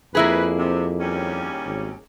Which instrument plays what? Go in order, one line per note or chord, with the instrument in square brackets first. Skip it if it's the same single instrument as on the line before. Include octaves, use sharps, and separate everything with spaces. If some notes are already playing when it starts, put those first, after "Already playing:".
[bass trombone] F2 [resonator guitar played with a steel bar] A#3 E4 G#4 [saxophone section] B4
[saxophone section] C3
D#2 G3 C#4
[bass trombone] G#1